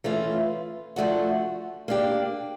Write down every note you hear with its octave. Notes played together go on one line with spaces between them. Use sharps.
E3 A3 C#4 F4
F3 A3 D4 F#4
A#3 D4 G4